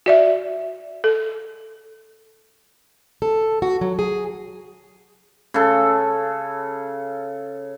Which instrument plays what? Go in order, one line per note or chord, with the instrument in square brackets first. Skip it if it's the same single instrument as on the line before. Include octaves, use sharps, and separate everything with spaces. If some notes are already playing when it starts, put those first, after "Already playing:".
[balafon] F#4 D5 E5
A4
[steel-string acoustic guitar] A4
F#4
F#3
G#4
[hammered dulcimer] C#3 A4